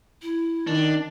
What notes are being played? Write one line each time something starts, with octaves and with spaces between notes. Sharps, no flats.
E4
D#3 D4